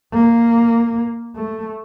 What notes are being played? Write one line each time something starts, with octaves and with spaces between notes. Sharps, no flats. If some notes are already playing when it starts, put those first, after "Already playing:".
A#3
A3